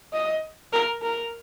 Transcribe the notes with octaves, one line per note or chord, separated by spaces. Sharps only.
D#5
A#4
A#4